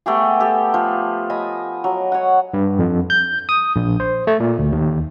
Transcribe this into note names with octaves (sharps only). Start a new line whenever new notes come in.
A3 B3 G4 G#4
G4 A4
F3
D#5 G#5 B5
F#3
C#5 F#5
G2
F2
G6
D#6
A#1
C5
A3
A#2
D2
D#2